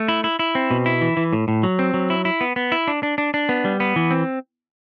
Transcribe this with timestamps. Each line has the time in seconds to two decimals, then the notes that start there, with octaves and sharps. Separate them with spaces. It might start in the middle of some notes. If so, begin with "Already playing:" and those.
Already playing: A3
0.08 E4
0.24 E4
0.39 E4
0.55 C4
0.71 B2
0.86 E4
1.01 E3
1.17 E3
1.33 A2
1.48 A2
1.63 F#3
1.79 C4
1.94 F#3
2.10 E4
2.25 E4
2.41 B3
2.56 B3
2.72 E4
2.88 D4
3.03 D4
3.18 D4
3.34 D4
3.49 B3
3.65 G3
3.80 B3
3.96 E3
4.11 C4